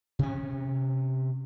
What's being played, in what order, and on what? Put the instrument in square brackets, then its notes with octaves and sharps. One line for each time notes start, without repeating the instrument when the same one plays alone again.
[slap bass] C3 C#4